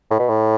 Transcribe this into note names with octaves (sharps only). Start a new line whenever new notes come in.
A2
B2
A2